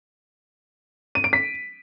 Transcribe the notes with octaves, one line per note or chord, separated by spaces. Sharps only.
D#7
D7
B6